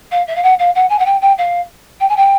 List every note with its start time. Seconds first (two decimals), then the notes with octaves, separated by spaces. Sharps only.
0.11 F5
0.27 E5
0.35 F5
0.43 F#5
0.59 F5
0.75 F#5
0.89 G#5
0.99 F#5
1.05 G5
1.21 G5
1.38 F5
2.00 G5
2.09 G#5
2.17 G5